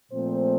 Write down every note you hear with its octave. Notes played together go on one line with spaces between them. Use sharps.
A#2 F3 A3 C4 C5